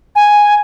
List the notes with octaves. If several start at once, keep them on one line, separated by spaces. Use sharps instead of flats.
G#5